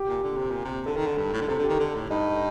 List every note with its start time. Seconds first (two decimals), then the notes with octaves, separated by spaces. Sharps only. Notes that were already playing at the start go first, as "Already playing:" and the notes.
Already playing: G4
0.08 A#2
0.23 D3
0.37 C3
0.50 A#2
0.65 C3
0.86 D3 A4
0.96 D#3
1.07 D3
1.17 G2
1.33 A2
1.40 D3
1.48 C3 A4
1.59 D3
1.63 G4
1.69 D#3
1.79 D3
1.95 A2
2.10 G2 D#4